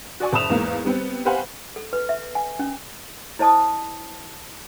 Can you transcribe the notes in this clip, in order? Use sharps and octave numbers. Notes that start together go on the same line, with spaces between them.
F#4 D5 G#5 C#6
F#1 A5 B5 D#6 E7 F7
E2 G#2 A#3 B3
G3 B3 C4
G4 B4 C5 F5 F#5 G#5
A4
B4
E5
G#5
C#4
E4 C5 D#5 A5 D#6